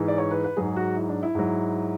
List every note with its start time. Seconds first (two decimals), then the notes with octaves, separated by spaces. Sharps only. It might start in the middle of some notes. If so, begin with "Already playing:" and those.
Already playing: G#2 E3
0.08 D5
0.18 C#5
0.31 B4
0.44 B4
0.57 G#2 F#3 G#4
0.76 F#4
0.97 E4
1.09 D4
1.23 E4
1.35 G#2 F#3